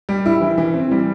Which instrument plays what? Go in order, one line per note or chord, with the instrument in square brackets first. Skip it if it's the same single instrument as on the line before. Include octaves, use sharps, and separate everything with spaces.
[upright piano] G3
E4
E3
E3
C4
G3